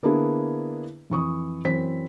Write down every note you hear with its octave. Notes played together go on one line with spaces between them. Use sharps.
D3 A#3 B3 D4 E4 G#4
F2 E3 C#6 D#6
F#2 E3 C4 C5 B6